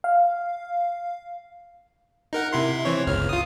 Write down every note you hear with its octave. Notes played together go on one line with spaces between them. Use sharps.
F5
D#4 A#4 F#5
C3 E4 C6
E3 C4 C#5
G1 C#2 F6
F4 D#6